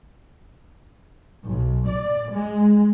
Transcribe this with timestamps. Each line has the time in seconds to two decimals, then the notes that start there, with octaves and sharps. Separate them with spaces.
1.47 B1
1.88 D5
2.32 G#3